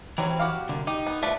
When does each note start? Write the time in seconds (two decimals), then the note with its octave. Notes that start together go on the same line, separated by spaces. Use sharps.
0.18 E3 F#3 G3 C4
0.39 F#4 G4 F5
0.69 C2 D3
0.87 D#4 G4
1.07 B3
1.23 A3 F4 B4 D5 E5